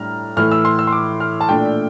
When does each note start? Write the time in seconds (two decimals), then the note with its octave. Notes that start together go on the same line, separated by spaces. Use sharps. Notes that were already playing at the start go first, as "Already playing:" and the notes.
Already playing: A2 G3 D4 A#5 F6
0.37 A2 E3 A3 F6
0.51 E6
0.65 C6
0.79 E6
0.87 C6
0.92 D6
1.20 F6
1.41 A5
1.49 A#2 A3 D4 G5